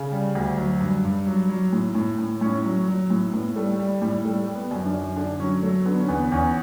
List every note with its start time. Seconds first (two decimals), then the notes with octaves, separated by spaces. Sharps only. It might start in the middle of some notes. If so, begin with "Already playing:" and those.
Already playing: C#3
0.12 G3
0.35 D2
0.58 F#3
0.80 G2
1.04 G2
1.26 F#3
1.49 F#3
1.73 A2
1.95 A2
2.19 A2
2.41 A2 C#4
2.64 F#3
2.88 F#3
3.10 A2
3.34 A2 B3
3.56 G3 A3
3.79 G3
4.02 A2 G3
4.24 G3 A3
4.47 G3
4.55 B3
4.71 F#2
4.85 D4
4.94 F#2
5.16 D3 D4
5.40 F#3 C#4
5.62 F#3 A3
5.85 D3 B3
6.00 C#4
6.08 E2 B3
6.22 B3
6.32 E2 C#4